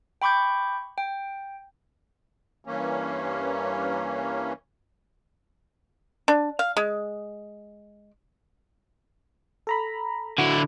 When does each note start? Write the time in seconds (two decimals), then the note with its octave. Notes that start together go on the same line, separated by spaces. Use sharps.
0.22 G5 B5 C#6 D6 G6
0.98 G5
2.65 G2 E3 A#3 C#4
6.28 D4
6.59 F5
6.77 G#3
9.67 A4 A#5 B5
10.38 D3 E4 F#4